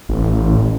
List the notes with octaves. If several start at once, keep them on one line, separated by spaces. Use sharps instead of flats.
A1